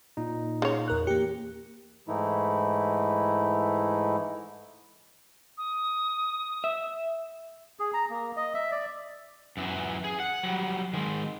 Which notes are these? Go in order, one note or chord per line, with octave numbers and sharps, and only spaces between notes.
A#2 D#4
C#3 C#5
E2 A#4 F#6
E3 A#3 G4 C#7
G#2 E3 A3 D#4 E4
D#6
E5
G#4
A#5
A#3
D#5
E5
D5
F#2 E3
G#4
F#5
F#3 G3
D#3 G#3